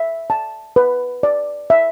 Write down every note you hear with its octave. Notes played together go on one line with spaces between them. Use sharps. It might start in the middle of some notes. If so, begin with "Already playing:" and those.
Already playing: E5
A5
B4
D5
E5